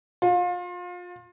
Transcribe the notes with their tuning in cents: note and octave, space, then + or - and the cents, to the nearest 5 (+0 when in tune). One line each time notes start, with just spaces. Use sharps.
F4 +30